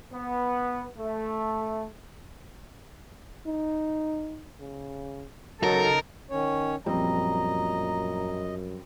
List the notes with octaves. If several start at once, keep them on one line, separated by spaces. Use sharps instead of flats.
B3
A3
D#4
C#3
C#3 F#3 D#4 A4 A#4
D#3 C#4 C#5
F#2 A#2 F3 G3 C4 D#5 A#5